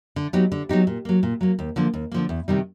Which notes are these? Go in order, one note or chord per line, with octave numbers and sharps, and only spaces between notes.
D3
F#3 B3 D#4 G4
D3
F#3 B3 D#4 G4
A#2
F#3 A#3
A#2
F#3 A#3
D#2
D3 F3 A#3
D#2
D3 F3 A#3
E2
C3 D#3 G3